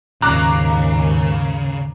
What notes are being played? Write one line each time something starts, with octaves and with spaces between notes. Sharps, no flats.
D#2 G#2 C#3 A#5 D6 F#6